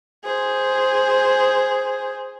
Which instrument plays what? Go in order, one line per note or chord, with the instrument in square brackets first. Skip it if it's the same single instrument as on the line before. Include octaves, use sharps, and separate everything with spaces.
[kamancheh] G#4 C5